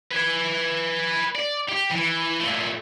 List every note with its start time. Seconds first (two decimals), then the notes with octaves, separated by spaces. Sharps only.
0.11 B4 G#5
1.35 D5
1.69 G4
1.91 E3
2.40 A#2 A3